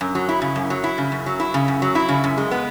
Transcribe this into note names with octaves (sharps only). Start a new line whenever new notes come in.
F#2
F#3
E4
C#3
F#2
F#3
E4
C#3
F#2
F#3
E4
C#3
F#2
F#3
E4
C#3
F#2
G#3
B3